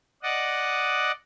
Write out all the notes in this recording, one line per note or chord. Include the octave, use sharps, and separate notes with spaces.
D5 D#5 F#5